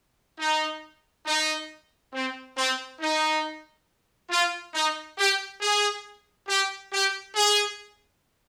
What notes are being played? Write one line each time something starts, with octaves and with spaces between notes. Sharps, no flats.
D#4
D#4
C4
C4
D#4
F4
D#4
G4
G#4
G4
G4
G#4